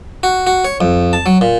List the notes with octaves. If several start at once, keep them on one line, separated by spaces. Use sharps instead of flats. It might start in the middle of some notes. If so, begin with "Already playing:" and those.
F#4
F#4
C#5
F2
A5
F#3
A#2